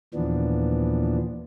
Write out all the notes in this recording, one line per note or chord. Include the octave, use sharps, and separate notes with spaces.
D#2 A#2 E3 F3 B3 D4